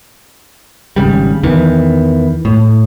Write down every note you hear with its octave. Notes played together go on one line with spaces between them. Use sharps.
G#1 C#3 G3
E2 D#3 E3
A2